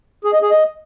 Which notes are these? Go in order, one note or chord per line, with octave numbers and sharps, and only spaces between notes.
G#4
D#5
G#4
D#5